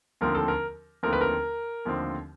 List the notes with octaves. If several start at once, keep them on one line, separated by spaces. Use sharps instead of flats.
D#2 D3 F3 A3 C4 A#4
A4
A#4
D#2 D3 F3 A3 C4 A#4
B4
A#4
D#2 D3 F3 A3 C4